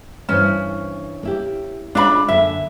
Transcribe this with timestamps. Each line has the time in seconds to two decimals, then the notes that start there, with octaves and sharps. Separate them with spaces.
0.29 G2 E3 C#4 C5
1.23 A#3 E4 G4
1.95 G#3 C#4 D4 F4 E5 B5
2.28 F#2 D3 A#3 E5